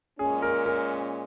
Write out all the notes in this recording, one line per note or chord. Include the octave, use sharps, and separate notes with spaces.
A#2 G#3 C#4 G#4
A#4
A#4